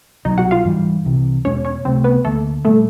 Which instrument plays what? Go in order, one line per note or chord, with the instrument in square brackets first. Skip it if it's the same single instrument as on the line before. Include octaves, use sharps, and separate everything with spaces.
[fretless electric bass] C2 B2 F#3 [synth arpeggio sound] D#4 D#5
[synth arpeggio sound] F#4 F#5
F4 F5
[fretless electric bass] G#2 E3 G3
C2 C3 E3
[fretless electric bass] E2 B2 G#3 [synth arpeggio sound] C#4 C#5
[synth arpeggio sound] C#4 C#5
[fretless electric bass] C#2 C3 E3 A3 [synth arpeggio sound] C4 C5
[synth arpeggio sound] B3 B4
[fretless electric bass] D2 D3 F3 A#3 [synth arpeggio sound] A3 A4
[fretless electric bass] A#2 G3 [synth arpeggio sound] A3 A4